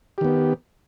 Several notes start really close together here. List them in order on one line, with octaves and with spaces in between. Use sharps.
G4 D#3 B3